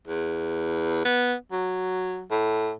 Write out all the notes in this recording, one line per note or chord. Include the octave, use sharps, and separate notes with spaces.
E2
B3
F#3
A2